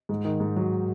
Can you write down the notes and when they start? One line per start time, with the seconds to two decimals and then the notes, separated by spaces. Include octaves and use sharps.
0.09 G#2
0.25 D#3
0.40 G#2
0.56 F#3